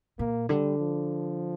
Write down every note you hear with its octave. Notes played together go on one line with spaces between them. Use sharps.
A#2 A#3
D3 G3
F3